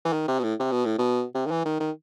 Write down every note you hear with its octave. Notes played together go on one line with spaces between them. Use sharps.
E3
D#3
C3
B2
A2
C3
B2
A2
B2
C3
D#3
E3
D#3
D#3